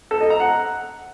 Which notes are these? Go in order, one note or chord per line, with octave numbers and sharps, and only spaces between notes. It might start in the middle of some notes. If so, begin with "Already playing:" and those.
A4
D#5
A#5
F#5